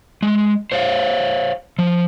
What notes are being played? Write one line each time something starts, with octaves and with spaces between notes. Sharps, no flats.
G#3
C5 C#5 F5
F3